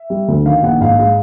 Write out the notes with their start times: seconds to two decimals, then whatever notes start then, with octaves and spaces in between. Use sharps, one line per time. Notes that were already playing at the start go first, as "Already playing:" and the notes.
Already playing: E5
0.10 G3
0.28 D2
0.45 D#3 F5
0.63 A#1 F#5
0.80 G#2 F5
0.99 G#3 F5